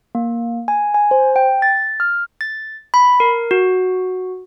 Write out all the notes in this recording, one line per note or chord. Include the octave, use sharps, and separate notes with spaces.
A#3
G#5
G#5
C5
G5
A6
F6
A6
B5
A#4
F#4